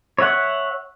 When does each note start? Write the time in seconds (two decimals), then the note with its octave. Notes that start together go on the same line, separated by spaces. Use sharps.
0.19 C#5 E5 F#5